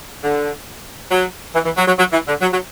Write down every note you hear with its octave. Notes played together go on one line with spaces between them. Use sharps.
D3
F#3
E3
E3
F#3
F#3
F#3
E3
D3
F#3
F#3